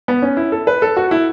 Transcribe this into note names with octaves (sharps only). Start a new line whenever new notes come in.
B3
C#4
E4
A4
B4
A4
F#4
E4